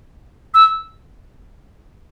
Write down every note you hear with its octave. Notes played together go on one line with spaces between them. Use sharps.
E6